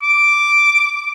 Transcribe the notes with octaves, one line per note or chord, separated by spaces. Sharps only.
D6